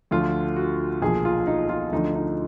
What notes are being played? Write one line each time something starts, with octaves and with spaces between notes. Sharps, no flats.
D2 D3 F3 F4
F#4
B1 A#2 F3 G#4
F4
D#4
F4
D2 D3 F3 D#4
D#4